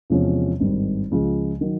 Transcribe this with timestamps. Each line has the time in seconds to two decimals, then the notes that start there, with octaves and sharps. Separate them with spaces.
0.10 E2 C3 F3 G#3 C#4
0.60 G#1 G2 D#3 G3
1.11 C#2 C#3 F3 G#3
1.61 D#3 F#3